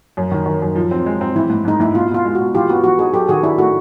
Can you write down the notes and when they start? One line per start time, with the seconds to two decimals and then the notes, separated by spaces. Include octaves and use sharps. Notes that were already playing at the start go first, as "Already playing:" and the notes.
0.17 F#2
0.32 D#3
0.46 D#3
0.62 F#2
0.75 F3
0.91 C4
1.06 G#3
1.21 C4
1.36 E3 E4
1.50 G#2
1.65 G#2 D#4
1.80 G#2 E4
1.94 B2 F4
2.10 B2 F4
2.25 G#3
2.35 F#4
2.40 B2
2.54 E3 F4 G4
2.69 B3 F#4
2.84 E3 F#4
2.99 D#4 F#4 G#4
3.13 F#3 G4 A4
3.29 D#3 F#4 G#4
3.43 D4 E4
3.58 A3 F#4